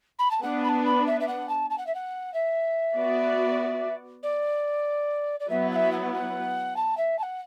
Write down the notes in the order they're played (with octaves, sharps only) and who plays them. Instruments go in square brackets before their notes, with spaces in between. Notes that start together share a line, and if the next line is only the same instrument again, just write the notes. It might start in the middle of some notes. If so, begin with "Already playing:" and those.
[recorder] B5
A5
[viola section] B3 D4 B4 [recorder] F#5
[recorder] B5
A5
B5
E5
E5
F#5
A5
A5
F#5
E5
F#5
E5
[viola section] B3 F#4 D5
[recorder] D5
D5
[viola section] F#3 B3 E4 B4 [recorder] E5
[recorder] F#5
E5
F#5
F#5
A5
E5
A5
F#5